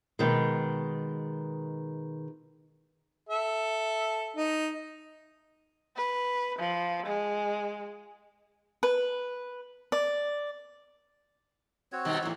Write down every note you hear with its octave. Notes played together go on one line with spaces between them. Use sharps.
B2 D#3 G#3
A4 E5
D#4
B4
F3
G#3
B4
D5
C4 F#4 C#5
B2 D#3 G3
E2 A2